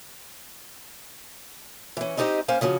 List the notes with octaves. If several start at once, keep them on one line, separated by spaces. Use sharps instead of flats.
E3 C#4
G#3 C4 D#4 G4 C5 D#5
A#3 C#4 C5 F5 G#5
C#3 F3 C#4 F#4